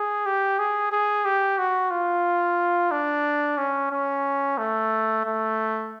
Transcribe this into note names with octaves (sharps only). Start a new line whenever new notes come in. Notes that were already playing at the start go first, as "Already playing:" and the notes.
Already playing: G#4
G4
G#4
G#4
G4
F#4
F4
D4
C#4
C#4
A3
A3